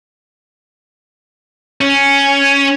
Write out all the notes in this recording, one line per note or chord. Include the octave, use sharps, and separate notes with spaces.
C#4